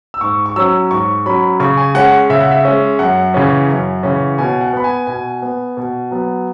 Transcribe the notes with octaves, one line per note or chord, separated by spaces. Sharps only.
E6
G#2 C#6
C#6
F#3 C#4 E6
G#2 C#6
F#3 C#4 B5
C#3 C#6
G#5
G#3 C#4 F#5
C#3 E5
F#5
E5
G#3 C#4
F#2 F#5
C#3 E3 C#4
F#2
C#3 E3 C#4
B2 G#5
F#5
B3 B5
G#5
B2 G#5
B3
B2
F#3 B3